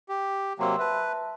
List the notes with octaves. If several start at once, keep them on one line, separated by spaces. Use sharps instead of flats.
G4
C3 F#3 A#3 G5 C6 E6
B4 E5 A5